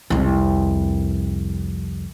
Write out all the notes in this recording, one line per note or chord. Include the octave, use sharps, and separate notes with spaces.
C2 F2